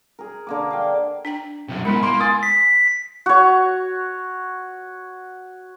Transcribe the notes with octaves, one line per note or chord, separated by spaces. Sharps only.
G#4 A#4
D3 A#3 D6
F5 G5
D4 G5 A#5
F#2 C3
G#2 G#3 B3 E4 A#4 B5
A#3 C6
G#5 C6 D#6 A6
B6
F#4 C#5